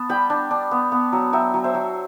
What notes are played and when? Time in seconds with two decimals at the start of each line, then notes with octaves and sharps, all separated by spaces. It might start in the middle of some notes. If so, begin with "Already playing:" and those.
Already playing: B3 A5
0.09 G3 G5 B5
0.30 D4
0.51 D4
0.71 B3
0.92 B3
1.12 F#3
1.33 F#3 E5 G5
1.54 F#3
1.64 C5 E5
1.74 F#3